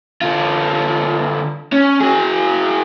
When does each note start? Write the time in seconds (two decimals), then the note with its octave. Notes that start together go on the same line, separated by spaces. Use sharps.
0.22 D3 F4
1.73 C#4
2.01 F#4 G#4